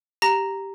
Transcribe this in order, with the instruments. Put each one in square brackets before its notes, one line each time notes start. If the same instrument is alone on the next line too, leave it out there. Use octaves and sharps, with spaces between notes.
[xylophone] G4 A#5 A#6